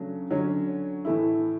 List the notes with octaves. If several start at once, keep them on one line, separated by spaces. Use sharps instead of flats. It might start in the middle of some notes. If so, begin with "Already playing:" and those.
Already playing: C#3 F#3 A3 D4
D3 F#3 C#4
A2 E3 A3 E4